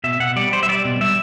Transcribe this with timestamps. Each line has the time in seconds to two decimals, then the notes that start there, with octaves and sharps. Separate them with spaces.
0.04 B2 E5
0.20 B2 F#5
0.36 G3 D5
0.52 G3 C5
0.63 E5
0.69 G3 D5
0.85 B2
1.00 G3 E5